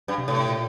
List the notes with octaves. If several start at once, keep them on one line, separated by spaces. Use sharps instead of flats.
G2
C3
A2
A#2